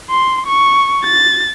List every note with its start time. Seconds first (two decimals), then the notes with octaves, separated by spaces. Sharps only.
0.10 C6
0.46 C#6
1.04 A6